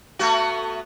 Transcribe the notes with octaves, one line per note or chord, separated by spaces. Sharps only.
A3 B3 F#4